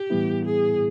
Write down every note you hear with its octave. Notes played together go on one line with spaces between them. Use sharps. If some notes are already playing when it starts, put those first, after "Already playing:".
Already playing: G4
A2 E3 G3 B3 E4
G#4